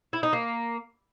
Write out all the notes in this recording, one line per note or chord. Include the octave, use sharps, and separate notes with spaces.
E4
D#4
A#3